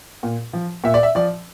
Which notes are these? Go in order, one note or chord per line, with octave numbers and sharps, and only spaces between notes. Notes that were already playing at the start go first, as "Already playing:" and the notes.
A#2
F3
A#2 E5
D5
E5
F3 D5